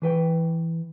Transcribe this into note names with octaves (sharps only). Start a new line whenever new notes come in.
E3 B4 G5